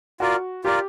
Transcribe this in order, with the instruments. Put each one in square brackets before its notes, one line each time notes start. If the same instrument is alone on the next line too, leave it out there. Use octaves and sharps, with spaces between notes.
[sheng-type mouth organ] F4 A#4 D5 [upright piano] F#4
[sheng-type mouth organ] F4 A#4 D5 [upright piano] G4